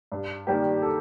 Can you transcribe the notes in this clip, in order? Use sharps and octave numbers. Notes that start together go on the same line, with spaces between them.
G2
D#3 G3 A#3 G4
A4